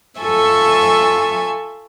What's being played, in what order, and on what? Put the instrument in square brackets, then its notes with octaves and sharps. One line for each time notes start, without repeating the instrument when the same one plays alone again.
[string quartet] F4 A4 E5 G#5 C#6